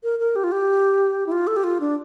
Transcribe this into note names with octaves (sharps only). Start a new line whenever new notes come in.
A#4
A#4
G4
F4
G4
E4
F4
A4
G4
F4
D4